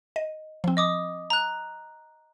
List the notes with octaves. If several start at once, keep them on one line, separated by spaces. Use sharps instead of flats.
D#5
F3 C4
D#5 D6 D#6
A#5 F#6